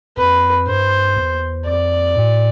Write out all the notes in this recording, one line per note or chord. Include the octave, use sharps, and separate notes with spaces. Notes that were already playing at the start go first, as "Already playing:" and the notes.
F2 B4
G2 C5
E2
F2 D5
A2